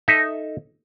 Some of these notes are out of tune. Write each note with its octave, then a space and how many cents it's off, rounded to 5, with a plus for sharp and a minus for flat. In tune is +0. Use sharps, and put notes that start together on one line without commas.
D#4 +0 A4 +0 E5 +0